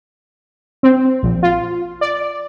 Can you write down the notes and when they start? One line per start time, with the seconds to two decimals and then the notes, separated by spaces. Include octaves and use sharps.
0.83 C4
1.23 A#1
1.43 F4
2.01 D5